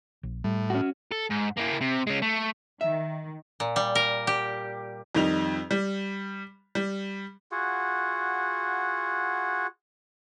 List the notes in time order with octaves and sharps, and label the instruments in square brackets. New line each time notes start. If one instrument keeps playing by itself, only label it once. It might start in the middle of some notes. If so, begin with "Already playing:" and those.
[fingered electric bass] A#1
[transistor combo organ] A2 [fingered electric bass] G3
[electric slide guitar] C#4 F#4
[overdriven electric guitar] A4
G#2
A#3 E4
C3
G#3 C#4
A3
[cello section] D#3 [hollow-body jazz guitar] E5
[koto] A#2
G3
A#4
G4
[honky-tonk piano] F2 D#3 G3 D#4 F7
G3
G3
[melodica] F4 F#4 G#4 F#5